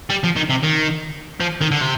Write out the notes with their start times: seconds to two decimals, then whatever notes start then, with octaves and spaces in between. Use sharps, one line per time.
0.10 G3
0.24 F3
0.36 D#3
0.49 C3
0.63 D#3
1.40 F3
1.61 D#3
1.71 D3
1.81 C3